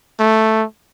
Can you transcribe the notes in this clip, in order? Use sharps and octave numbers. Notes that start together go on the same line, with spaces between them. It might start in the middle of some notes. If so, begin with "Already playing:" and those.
A3